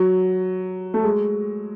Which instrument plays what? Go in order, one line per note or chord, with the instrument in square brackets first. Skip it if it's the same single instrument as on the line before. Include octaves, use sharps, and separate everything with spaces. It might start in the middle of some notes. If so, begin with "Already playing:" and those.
Already playing: [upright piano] F#3
A3
G#3